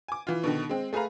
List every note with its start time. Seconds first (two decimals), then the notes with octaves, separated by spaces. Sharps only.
0.08 G#5 D6
0.27 E3 F4
0.44 B2 D3 D#3
0.69 G#3 C4
0.93 A3 G#4 B4 F5 A#5